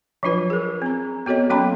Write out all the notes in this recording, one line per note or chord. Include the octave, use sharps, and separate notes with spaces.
F3 F#3 D4 F4 B4
G#4 A#4
C4 A#5
B3 F#4 A4 C#5 D#5
F#3 A#3 C#4 G5 B5 C6